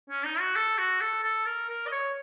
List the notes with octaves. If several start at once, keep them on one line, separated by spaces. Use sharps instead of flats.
C#4
D#4
F#4
A4
F#4
A4
A4
A#4
A#4
D#5
C#5